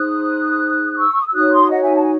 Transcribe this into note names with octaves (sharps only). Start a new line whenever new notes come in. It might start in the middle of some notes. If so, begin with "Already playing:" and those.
Already playing: D#4 G#4 C5 D#6 F#6
D#6
C#6 E6
C#6
D#6
E6
D#4 F#4 C#5 D#6 F#6
C6 D#6
D#5 F#5
E5 G#5
A5
G#5